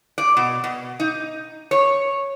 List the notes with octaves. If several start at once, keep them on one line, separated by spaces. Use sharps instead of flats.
D5
B2
B2
D#4
C#5